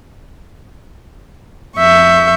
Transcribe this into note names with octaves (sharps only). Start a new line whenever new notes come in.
F2 E5 C#6 G6